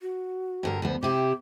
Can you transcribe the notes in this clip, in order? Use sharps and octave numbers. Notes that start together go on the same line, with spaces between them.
F#4
G2 D3 A#4
D2 F3 B3
C3 E4 G4 D6